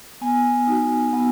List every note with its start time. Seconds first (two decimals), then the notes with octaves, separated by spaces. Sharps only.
0.21 B3 G#5
0.67 D#4 F#4
1.13 B3 F#5